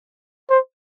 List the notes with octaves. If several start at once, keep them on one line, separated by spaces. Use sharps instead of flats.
C5